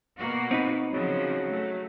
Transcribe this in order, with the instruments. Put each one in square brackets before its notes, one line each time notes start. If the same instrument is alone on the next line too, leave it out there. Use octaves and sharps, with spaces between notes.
[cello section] B2 A#3 F#4
[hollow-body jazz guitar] C4 D#4 B4
[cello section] C#3 F3 [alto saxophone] F#3
[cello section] A3